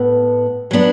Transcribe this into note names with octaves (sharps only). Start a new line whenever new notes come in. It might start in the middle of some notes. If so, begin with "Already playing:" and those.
Already playing: A2 B3
F#3 B3 D4